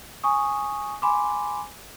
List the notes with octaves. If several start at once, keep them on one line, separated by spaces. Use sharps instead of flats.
G#5 C#6 D#6
G#5 B5 C6 D6